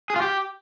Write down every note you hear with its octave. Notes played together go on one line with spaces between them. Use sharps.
G#4
F4
G4